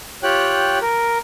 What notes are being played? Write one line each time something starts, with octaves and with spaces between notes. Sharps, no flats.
F4 G4 C#5 G5 F#6
A#4